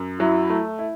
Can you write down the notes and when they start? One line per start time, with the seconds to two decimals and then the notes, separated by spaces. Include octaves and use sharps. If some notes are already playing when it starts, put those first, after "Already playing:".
Already playing: F#2
0.19 F#3 E4
0.50 A3
0.79 E4